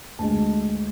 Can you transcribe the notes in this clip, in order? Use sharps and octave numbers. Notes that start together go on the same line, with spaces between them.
D2 D3 G#3 A5